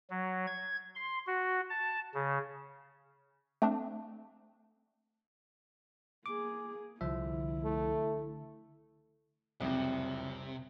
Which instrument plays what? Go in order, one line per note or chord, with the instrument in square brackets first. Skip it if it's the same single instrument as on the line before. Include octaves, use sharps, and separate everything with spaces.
[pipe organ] F#3
G#6
C6
F#4
A5
C#3
[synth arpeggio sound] A3 C4 D4 D6
[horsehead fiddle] A#3 G#4 [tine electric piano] D6
[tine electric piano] C2 F3 E5 [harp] D3 [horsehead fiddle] E4
[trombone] A3
[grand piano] F#1 F2 [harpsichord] C2 [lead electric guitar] C3